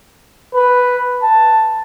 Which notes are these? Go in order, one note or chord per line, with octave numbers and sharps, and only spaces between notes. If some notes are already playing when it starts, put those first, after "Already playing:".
B4
A5